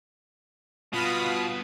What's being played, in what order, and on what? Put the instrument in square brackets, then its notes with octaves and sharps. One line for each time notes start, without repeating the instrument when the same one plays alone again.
[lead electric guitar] G2 B3 [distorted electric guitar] B2 [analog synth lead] F4 [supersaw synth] F5 B5 D#6